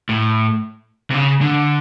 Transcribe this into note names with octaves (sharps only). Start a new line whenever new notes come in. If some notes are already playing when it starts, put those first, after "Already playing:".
A2
C3
C#3
D3